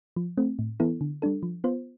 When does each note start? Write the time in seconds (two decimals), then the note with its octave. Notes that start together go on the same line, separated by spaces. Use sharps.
0.16 F3
0.38 A3 C4
0.59 A2
0.80 E3 B3 E4 A4
1.01 D3
1.22 G3 D4 A4
1.43 F3
1.64 B3 F4 C5